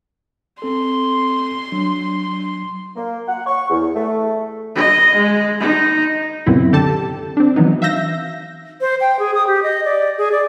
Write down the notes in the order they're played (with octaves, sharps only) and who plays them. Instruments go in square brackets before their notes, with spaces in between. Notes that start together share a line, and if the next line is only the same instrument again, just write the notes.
[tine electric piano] C4 A4 [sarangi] C6
[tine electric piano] F#3 D4
[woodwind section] A#3
F#5
C#6
E2
A3
[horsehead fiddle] D#5
G#3
D#4
[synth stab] F#2 A#2 C#3 B3 C4 E4
D3 G4 A4 A5
C4 D4
E3 F#3 B3 D#4
E5 F5 E6 G6 A#6
[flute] C5
G5
G#4
D#6
G4
D#5
D5
G#4
D5